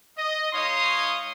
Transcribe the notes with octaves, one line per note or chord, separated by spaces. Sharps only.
D#5
G#3 D#4 C#5 F5 C6 D#6